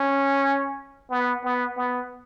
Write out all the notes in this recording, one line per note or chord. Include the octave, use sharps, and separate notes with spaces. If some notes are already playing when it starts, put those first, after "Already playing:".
Already playing: C#4
B3
B3
B3